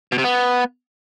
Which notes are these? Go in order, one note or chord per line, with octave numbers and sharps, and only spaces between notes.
B2
C3
B3